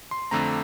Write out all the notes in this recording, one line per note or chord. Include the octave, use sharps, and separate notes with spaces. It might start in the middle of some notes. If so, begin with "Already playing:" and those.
C6
F2 D3 A3 C4 A#5